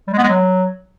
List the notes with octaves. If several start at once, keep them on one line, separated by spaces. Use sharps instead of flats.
G3
G#3
B3
G#3
F#3